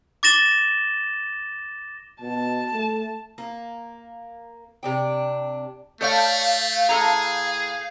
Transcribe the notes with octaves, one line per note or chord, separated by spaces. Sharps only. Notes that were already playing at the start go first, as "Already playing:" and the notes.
D6 A6 A#6 E7 G7
B2 A5
A3
A#3
C3 D4 G5
A3 A4 C#5 D5 F5 G6
A2 G#4 A4 A#5